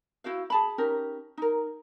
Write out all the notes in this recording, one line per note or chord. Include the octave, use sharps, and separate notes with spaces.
E4 F#4 C5 F5
G#4 A5 B5
C#4 D#4 G4 A#4
D#4 A#4